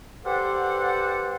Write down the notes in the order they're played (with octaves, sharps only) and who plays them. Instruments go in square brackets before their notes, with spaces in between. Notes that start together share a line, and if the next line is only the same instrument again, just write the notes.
[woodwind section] G4 A4 B4 C5 D5 F#5